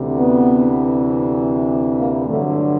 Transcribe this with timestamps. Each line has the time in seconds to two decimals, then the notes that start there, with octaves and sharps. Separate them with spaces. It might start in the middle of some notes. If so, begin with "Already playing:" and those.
Already playing: D2 C3 E3
0.17 B3
1.99 A#3
2.28 G2 D3 F#3 A3